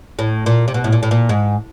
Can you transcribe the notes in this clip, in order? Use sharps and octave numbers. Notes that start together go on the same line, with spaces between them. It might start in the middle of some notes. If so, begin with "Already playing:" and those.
A2
A#2
C3
B2
A2
A#2
A2
A#2
G#2